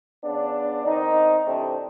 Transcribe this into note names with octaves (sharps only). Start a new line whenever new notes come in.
C#3 B3 D4
D#3 C4 D#4
C3 E3 A3 C4 D4